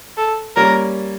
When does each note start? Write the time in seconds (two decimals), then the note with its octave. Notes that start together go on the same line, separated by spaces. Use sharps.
0.17 A4
0.56 G3 A#3 C#4 A#4